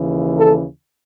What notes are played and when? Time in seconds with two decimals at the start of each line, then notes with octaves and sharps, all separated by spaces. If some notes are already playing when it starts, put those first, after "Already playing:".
Already playing: D#2 C#3 E3
0.37 A4